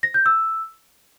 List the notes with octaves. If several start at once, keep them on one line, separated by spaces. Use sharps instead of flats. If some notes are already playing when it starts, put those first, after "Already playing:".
A#6
G6
E6